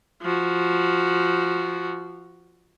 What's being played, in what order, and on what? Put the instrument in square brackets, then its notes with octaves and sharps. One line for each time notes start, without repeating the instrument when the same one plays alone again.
[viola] F3 F#4